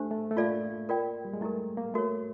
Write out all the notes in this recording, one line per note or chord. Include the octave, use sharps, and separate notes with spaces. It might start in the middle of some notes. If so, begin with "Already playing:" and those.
Already playing: A3 D4 G4 C5
A3
A3
A#3 F4 A4 D5 F5
F4 A#4 D5 G5
G3
G#3
A3 E4 G4 A#4
A#3
A3 F#4 A#4 C#5